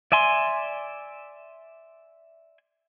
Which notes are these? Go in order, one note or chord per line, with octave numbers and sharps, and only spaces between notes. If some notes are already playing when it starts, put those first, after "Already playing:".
D5 E5 G#5 C6